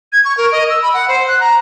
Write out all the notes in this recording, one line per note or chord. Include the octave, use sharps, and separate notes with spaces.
G#6
C#6
A#4
D#5
E6
B5
F#5
C5
F#6
A#5